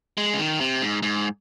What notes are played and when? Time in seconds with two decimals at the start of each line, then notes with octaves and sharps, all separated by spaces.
0.18 G#3
0.33 C#3
0.39 D#3
0.61 C3
0.82 G#2
1.03 G#2